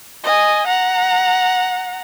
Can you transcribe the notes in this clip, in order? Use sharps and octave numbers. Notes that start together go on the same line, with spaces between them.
D#5 G#5
F#5 A#5